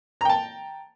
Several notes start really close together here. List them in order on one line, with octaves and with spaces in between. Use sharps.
A#5 G5 A5